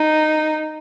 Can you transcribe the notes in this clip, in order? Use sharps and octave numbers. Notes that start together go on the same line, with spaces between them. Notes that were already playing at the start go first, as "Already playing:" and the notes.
Already playing: D#4